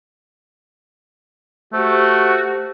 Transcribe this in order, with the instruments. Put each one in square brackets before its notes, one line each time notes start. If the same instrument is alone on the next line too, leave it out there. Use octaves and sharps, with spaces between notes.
[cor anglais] A3 [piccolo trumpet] F#4 [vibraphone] G4 C5